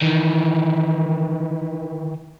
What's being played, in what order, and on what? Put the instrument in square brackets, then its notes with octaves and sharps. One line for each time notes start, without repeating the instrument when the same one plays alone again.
[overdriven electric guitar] D#3 E3